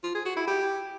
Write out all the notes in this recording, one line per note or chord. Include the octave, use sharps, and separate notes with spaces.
F4
G#4
F#4
E4
G4